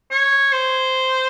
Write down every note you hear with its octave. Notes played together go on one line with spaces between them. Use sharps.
C#5
C5